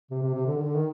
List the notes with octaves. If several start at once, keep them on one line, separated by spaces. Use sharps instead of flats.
C3
C3
C3
D3
D#3
D3
D#3